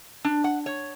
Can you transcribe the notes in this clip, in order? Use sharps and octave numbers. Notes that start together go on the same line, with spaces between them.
D4
F#5
C#5